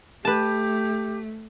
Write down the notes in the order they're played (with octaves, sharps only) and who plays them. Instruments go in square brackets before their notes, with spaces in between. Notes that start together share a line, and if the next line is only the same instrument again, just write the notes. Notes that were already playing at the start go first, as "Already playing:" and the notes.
[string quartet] A3 [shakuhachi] G4 [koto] B4 A5